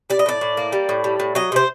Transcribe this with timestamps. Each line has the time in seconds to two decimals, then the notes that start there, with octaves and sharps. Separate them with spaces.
0.10 G3 D5
0.19 D#5
0.26 A2 D5
0.41 A2
0.57 A#3
0.73 G3
0.89 A2
1.04 G3
1.20 A2
1.35 F#3 D#5
1.52 C3 C5